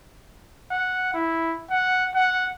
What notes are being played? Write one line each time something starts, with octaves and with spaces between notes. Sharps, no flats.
F#5
E4
F#5
F#5